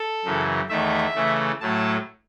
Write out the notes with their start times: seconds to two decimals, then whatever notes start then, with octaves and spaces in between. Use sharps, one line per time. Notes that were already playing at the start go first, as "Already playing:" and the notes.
Already playing: A4
0.25 F#2 C#3 E3
0.69 E2 D#3 A3 E5
1.15 C#3 E3 A3
1.60 A2 F#3 A3 A5